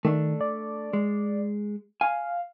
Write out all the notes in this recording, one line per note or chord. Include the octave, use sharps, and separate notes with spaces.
D#3 A3 D4
D5
G#3
F5 G#5